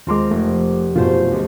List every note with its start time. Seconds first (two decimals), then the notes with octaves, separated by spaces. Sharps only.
0.07 D#2 G#3 C4 F4 A#4 C6 D6
0.31 F1 A3
0.96 F1 F#2 B2 A3 F4 C5
1.32 C#2